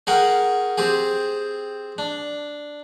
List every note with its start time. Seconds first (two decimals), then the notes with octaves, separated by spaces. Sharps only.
0.07 C#4 G#4 A#4 F#5 G5
0.78 C4 G4 G#4
1.98 D4